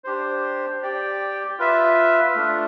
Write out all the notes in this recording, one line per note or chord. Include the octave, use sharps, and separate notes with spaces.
D4 G4 C5
G4 D5 G5
F4 B4 E5
A3 D4 F4